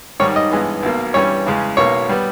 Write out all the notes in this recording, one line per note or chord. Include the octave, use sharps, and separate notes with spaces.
G#2 D#3 G3 C#5
D#5
G2 E3 G#3 B3
B1 B2 A#3
G2 E3 G3 C#4 C#5
E2 C#3 G#3 C#4
B1 B2 A#3 C#5
G3 B3